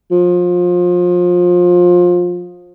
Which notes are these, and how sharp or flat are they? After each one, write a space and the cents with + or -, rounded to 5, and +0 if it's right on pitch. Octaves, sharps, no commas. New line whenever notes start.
F3 +25